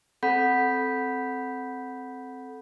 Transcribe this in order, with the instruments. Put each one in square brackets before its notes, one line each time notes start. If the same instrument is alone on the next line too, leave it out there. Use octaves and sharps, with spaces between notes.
[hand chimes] C4 A4 F#5 B5 G6 B6